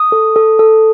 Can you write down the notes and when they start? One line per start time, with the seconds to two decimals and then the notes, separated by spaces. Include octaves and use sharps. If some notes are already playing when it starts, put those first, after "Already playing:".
Already playing: D#6
0.12 A4
0.36 A4
0.59 A4